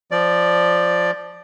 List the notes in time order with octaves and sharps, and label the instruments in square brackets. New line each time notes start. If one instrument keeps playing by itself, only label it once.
[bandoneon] F3 D5